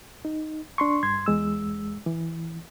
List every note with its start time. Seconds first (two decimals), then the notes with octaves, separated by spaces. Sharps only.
0.25 D#4
0.78 D4 C6 C#6
1.03 G2 C6 G#6
1.26 E2 G#3 E6
2.06 E3